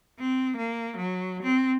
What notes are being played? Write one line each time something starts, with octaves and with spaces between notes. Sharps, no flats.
C4
A#3
F#3
C4